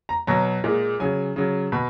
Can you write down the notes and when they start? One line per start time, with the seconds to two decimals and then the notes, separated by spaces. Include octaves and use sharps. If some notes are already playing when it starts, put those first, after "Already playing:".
0.09 A#5
0.27 B2 F#3 A#5
0.64 A#2 G#3
1.00 C#3 F#3 G#5
1.36 C#3 F#3
1.72 B2 B5